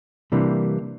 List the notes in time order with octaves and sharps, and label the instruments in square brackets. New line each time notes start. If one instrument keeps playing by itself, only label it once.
[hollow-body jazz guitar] C3 E3 G3 A#3 D4